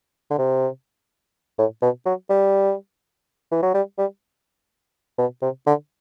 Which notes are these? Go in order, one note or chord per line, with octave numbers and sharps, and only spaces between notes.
D3
C3
A2
B2
F#3
G3
E3
F#3
G3
G3
B2
C3
D3